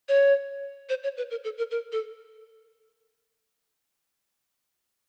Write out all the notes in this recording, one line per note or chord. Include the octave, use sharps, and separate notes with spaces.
C#5
C5
C#5
B4
A#4
A4
A#4
A#4
A4